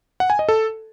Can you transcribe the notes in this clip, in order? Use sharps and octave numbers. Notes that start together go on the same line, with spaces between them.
F#5
G#5
D#5
A4